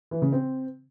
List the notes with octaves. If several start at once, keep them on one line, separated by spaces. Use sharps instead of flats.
E3
C#3
C4